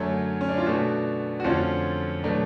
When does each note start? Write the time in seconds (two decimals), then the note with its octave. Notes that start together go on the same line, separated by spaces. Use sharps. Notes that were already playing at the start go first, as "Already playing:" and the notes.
Already playing: F#2 D3 F#3 A3 A4 C#5
0.41 C#4
0.49 D4
0.58 F4
0.66 B2 A3 D4 F#4
1.40 F#4
1.44 F2 D3 F3 A3 C#4 F4
2.24 B2 F#3 A3 D4